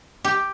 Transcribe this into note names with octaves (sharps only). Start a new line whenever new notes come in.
G4